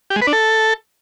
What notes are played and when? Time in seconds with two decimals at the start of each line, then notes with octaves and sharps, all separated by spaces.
0.10 G4
0.16 G#3
0.22 B4
0.27 D4
0.33 A4